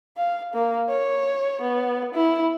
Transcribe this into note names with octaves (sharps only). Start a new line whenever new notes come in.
F5
A#3
C#5
B3
E4